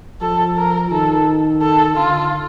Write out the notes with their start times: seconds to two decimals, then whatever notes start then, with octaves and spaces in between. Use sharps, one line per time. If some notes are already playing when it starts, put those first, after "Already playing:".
0.21 F3 A4
0.57 A#4
0.91 D#3 A4
1.61 A4
1.96 D3 F4